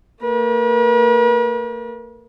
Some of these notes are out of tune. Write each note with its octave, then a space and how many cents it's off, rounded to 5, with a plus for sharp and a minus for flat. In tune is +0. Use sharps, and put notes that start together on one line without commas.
A#3 -45 B4 -45